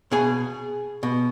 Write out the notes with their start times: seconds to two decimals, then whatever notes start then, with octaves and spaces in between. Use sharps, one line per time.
0.11 B2 G#4 G#5
1.03 B2